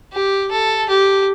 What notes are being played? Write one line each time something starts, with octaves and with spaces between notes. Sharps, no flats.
G4
A4
G4